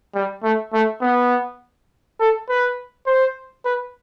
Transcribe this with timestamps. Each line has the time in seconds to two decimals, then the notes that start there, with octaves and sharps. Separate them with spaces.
0.15 G3
0.44 A3
0.74 A3
1.02 B3
2.20 A4
2.49 B4
3.07 C5
3.65 B4